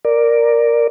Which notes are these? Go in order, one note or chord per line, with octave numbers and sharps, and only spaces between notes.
A#4 D5